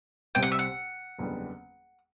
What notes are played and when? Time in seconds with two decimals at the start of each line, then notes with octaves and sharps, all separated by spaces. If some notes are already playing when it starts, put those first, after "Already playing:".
0.35 C2 C3 G3 C4 G5
0.43 F#5
0.52 E5
0.59 F#5
1.19 F#1 E2 D3 G3 B3